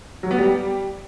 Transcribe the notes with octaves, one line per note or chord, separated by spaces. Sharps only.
F#3
B3
G3